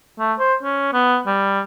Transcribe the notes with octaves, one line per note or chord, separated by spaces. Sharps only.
A3
C5
C#4
B3
G3